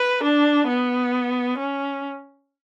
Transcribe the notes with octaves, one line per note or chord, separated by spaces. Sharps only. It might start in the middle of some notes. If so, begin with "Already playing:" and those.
Already playing: B4
D4
B3
C#4